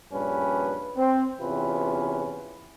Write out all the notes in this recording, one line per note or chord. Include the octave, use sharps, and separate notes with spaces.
A#1 G2 C#4 D4 B4
C4
E2 C3 C#4 F4 B4